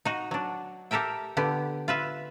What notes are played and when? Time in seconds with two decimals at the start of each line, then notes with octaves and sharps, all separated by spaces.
0.05 D#4 F#4
0.31 F#3 D4
0.91 G4 A4 A#4 E5 G5
1.37 D3 B3 G4
1.88 F4 B4 E5